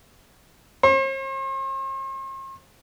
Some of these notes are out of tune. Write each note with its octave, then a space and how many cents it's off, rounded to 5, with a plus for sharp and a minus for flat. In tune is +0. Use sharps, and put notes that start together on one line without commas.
C5 +45